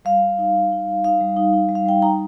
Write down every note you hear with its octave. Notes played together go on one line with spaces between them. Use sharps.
G3 F5
G3
D#4
D#4
D#4
D#4
D#4 F5
G3
D#4
D#4
G3
F5
G3 G5
D#4 A#5